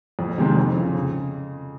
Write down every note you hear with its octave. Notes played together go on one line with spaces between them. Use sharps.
F2
C3 D#3 G#3 C4
F2
C#3 F3
C#3